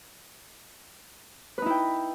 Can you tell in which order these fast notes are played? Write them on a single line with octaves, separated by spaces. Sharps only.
B4 D#4 E4 G5